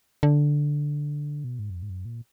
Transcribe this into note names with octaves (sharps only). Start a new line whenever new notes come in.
D3
B2
G#2
F#2
F2
G#2
F#2
A#2